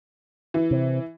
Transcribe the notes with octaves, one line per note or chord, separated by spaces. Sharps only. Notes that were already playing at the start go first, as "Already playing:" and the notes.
E3
C3